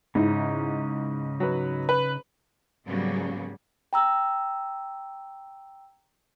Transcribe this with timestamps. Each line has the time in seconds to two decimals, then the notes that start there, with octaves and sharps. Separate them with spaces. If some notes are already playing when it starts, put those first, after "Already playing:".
0.15 G#2 C#3 D#4 E4
1.40 F#3 B4
1.89 B4
2.87 G#2 C#3 F#3 G3 A#3 B3
3.93 G5 A#5 E6